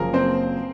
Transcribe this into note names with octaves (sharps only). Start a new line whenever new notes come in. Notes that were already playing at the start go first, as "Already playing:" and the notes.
Already playing: F#1 F#2 F3 A#3 G#4 A#4
C4 C5